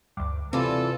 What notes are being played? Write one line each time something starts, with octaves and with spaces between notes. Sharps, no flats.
D2 G2 D6
C3 E3 C4 F4 A4 D5